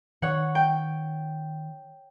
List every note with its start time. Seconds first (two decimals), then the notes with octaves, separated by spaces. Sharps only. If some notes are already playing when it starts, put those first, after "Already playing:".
0.22 D#3 C#5 F#5
0.55 G5